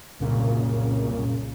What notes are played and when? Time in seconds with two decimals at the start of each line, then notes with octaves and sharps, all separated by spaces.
0.19 C2 F#2 A#2 C#3